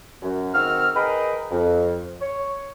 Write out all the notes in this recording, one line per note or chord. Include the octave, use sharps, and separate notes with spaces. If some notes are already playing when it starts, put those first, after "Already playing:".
F#2
D#3 G#3 C4 F#4 E6 F6
G#4 A#4 B4 D#5 G5 B5
F2
C#5